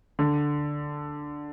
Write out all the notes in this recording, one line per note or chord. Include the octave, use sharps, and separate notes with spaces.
D3